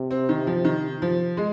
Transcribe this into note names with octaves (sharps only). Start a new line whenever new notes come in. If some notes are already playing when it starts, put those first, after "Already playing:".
Already playing: C3
C4
D#3
F3
D#3
F3
G#3